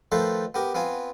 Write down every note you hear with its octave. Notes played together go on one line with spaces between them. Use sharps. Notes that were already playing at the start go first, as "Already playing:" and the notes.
D#3 F3 A3 A4 B4 C5
B3 G4 A#4
B3 C4 F4 G#5